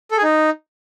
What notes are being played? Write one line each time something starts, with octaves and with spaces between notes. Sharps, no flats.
A4
G#4
D#4